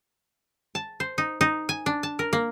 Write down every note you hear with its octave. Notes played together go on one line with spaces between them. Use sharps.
A5
C5
D#4
D#4
G#5
D4
A5
A#4
A#3